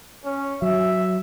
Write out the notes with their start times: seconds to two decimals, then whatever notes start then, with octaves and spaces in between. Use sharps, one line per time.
0.25 C#4
0.62 F#3 E5